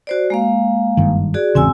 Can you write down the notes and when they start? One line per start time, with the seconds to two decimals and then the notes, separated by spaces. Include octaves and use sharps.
0.07 F#4 C5 D5
0.30 G#3 A#3 F5
0.97 F#1 G2 D#3
1.34 F#4 G#4 D5
1.55 G#1 E2 C#3 C4 G#5 E6